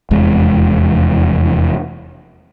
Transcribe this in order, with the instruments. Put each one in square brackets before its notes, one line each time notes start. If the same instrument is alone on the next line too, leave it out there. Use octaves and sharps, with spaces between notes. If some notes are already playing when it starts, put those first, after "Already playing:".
[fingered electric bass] F1 E2 G#3